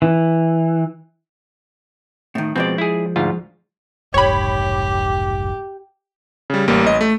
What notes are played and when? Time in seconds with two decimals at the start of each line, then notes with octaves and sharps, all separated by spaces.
0.02 E3
2.35 A2 D#3
2.56 B2 F3 G#3 C4 D5
2.78 E4 G#4
3.16 D2 G#2 F4
4.14 F1 B1 G#2 G4 C#5 B5
6.50 C#3 G3
6.68 A1 G3 A#3
6.86 A1 D#5
7.01 A3